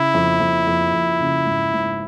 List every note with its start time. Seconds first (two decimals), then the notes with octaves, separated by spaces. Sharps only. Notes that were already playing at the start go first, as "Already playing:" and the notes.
Already playing: C#3 E4
0.14 F2
0.40 F2
0.68 F2
0.93 F2
1.20 C#3
1.47 G#1
1.73 G#1